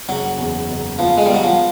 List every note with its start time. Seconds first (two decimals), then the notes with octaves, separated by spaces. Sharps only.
0.09 F#1 F#3
0.39 E2
0.68 F#1
0.98 F3 B3
1.18 G#3
1.26 G3 B3
1.34 F#3
1.44 F3